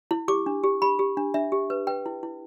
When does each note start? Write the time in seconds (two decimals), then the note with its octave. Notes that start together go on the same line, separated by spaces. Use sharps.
0.11 E4
0.28 G4 D6
0.46 D4
0.63 G4
0.82 G4 B5
0.99 G4
1.17 D4
1.34 D4 E5
1.52 G4
1.70 B4
1.87 B4 G5
2.06 E4
2.23 E4